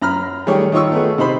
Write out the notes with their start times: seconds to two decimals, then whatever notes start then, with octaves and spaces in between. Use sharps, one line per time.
0.02 F#2 A#5 B5 F6
0.47 D#3 G3 A3 G4 G#4 C#5
0.72 D#3 D#4 F4 C#5 C#6 E6
0.92 A3 B3 G#4
1.18 C3 D#4 C5 B5